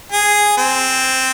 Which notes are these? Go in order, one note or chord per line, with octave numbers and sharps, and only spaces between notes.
G#4
C4